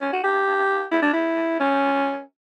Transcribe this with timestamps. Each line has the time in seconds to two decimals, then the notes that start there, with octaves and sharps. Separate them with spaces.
0.01 C#4
0.12 F#4
0.24 G4
0.92 E4
1.02 D4
1.13 E4
1.60 C#4